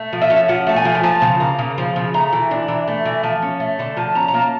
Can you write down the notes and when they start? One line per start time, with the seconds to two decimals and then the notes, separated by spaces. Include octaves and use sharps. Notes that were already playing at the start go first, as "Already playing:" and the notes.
Already playing: A3
0.13 F3
0.22 E5
0.30 C#4
0.48 F3 F#5
0.67 A3 A5
0.76 G#5
0.85 F3
0.95 G#5
1.03 F3 A5
1.22 C#3
1.40 A#3
1.59 C#3
1.78 F3
1.96 C#3
2.14 A3 A#5
2.33 E3
2.51 D4
2.68 E3
2.88 A3
3.05 E3
3.23 F3 A5
3.42 C#4
3.60 A3
3.79 D3 A5
3.97 F3 A5
4.15 C#4 A#5
4.28 A#5
4.34 A#3 A5